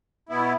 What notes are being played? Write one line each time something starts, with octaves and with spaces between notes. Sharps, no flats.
B2 B3 E4